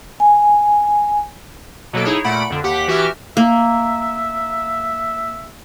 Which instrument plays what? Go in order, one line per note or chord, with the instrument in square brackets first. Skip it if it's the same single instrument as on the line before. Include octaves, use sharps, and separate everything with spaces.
[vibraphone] G#5
[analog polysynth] B2 F#3 A#3 A4 D7
D#4 E4 G#4 C#5
A#2 A3 F#5 B5 D7
F2 D3
D#2 G4 F#5 B6
E3 F#4 G4 E5 F6
[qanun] A#3 [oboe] E5